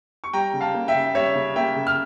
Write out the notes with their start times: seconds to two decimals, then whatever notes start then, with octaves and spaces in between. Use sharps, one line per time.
0.24 C#6
0.33 G3 G5 A#5
0.54 C#3
0.61 F5 A5
0.74 A#3
0.88 E5 G5
0.95 C#3
1.15 G3 C#5 E5
1.35 C#3
1.56 A#3 E5 G5
1.76 C#3
1.87 F6